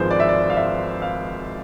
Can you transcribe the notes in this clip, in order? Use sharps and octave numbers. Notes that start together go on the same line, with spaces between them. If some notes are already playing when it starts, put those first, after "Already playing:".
Already playing: G#1 G#2 F3 G#3 B4 C5
D5
E5
D5
F5
E5
F5